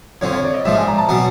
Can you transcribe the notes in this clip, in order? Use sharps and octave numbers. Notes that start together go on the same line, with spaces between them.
F2 D3 F3 C#5
C#5
D5
D#5
A#1 G#2 F3 E5
G#5
A#5
A5
B2 F#3 B3